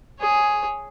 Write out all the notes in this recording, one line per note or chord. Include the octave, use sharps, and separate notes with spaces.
G#4 C#5